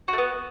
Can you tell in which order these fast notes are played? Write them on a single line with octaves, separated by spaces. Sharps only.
F#4 A3 B3